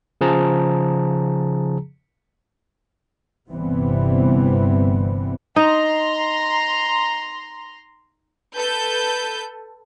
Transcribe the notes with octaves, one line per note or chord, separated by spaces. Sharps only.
C#3 F3 G#4 A5 A#5
G1 C3 E3 G3 B3 C4
D#4 A#5 C6
A4 B4 G6